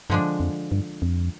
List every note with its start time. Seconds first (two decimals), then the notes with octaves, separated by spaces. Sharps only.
0.10 G2 D3 F3 G#3 D4
0.40 F2
0.72 G2
1.02 F2